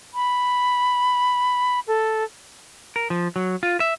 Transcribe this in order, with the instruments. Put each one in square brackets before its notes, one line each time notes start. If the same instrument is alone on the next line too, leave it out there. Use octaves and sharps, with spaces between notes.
[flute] B5
A4
[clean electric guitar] A#4
F3
F#3
F4
E5